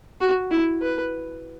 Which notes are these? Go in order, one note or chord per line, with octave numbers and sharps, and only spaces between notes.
F#4
E4
B4